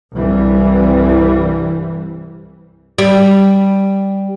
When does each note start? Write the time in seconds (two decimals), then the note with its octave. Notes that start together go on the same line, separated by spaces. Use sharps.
0.13 C2 G2 C3 E3 G3
2.98 G3